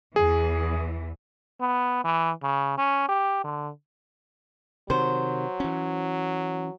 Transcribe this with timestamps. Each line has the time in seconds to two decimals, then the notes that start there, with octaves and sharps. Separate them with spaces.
0.16 E2 E3 G#4
1.61 B3
2.04 E3
2.43 C#3
2.78 C#4
3.09 G4
3.44 D3
4.90 C3 D#3 F#3 C5
5.60 E3 C#4